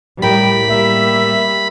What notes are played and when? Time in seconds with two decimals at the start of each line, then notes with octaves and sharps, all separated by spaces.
0.22 A2 G3 A#4 G5 B5
0.69 G3 A#3 E5